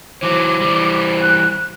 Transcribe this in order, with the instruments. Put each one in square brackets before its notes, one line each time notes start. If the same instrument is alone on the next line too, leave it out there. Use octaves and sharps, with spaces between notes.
[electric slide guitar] E3 F#3 [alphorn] C5 [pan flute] D6
[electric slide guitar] E3 G3
[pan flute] F#6